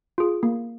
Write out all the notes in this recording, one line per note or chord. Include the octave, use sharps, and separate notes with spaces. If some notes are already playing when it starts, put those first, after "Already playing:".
F4 G#4
A#3